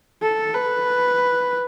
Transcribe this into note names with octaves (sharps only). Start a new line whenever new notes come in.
A4
B4